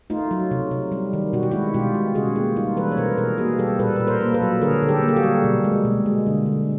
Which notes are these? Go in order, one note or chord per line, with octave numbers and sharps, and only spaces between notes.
A3 D#4 F4
F#3
C3
C3
G3
D#3
B2 F#4
G4
G#3 E4 F#4
B2 F4 G4
G#3
C#3 F#4 G#4
A#3 F4 G4
G3 D#4 F4
E3 A4 B4
C#5
B2 A#4 C5
B2 G#4 A#4
A#3 F#4 G#4
G3 G4 A4
A#2 A4 B4
A#2 B4
A#4 C5
A#3
A4 B4
F#3
D3 G#4 A#4
D3
G4 A4
A#3
G4
F#4 G#4
G3
B2
G#3
B2
G#3
D3
D3